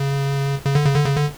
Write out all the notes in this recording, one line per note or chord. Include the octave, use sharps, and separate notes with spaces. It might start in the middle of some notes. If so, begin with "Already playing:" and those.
Already playing: C#3
C#3
D3
C#3
D3
C#3
D3